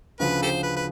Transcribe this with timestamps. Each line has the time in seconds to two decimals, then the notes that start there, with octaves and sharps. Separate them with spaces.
0.20 D2 C#3 F3 B4
0.42 G4 A4 C5
0.63 B4
0.76 B4